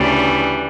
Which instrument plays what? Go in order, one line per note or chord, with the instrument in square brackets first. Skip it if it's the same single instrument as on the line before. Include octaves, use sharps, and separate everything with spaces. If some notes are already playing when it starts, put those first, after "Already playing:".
Already playing: [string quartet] D2 C#3 E3 G3